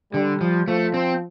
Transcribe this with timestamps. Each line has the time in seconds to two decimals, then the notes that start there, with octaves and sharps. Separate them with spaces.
0.13 D3 G3
0.41 F3
0.67 F3 A3
0.94 C4